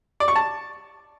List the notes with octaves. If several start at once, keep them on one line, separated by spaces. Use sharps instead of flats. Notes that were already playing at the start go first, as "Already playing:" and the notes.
D5
C#6
A5